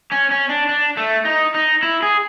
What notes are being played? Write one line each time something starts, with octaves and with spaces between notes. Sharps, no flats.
C#4
C#4
D4
D4
A3
D#4
D#4
E4
G#4